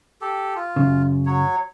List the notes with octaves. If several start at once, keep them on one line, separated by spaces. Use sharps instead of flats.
G4 A4
F4
F#2 C#3
F#3 C#5